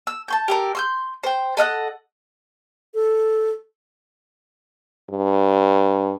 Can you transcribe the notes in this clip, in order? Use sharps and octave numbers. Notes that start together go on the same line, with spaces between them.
E6
A5 C6 G6
G4 A4 A#4
C6 E6 G6
C5 G5
A4 D#5 F5 F#5
A4
G2